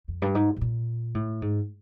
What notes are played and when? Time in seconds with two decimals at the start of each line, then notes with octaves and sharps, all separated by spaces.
0.08 F2
0.22 G2
0.35 G#2
0.56 B2
0.61 A#2
1.15 A2
1.42 G#2